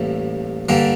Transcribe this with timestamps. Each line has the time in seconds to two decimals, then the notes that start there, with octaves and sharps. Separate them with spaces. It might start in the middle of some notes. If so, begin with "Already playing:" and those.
Already playing: A1 A2 E3 G3 A#3
0.69 G2 D3 G3 A#3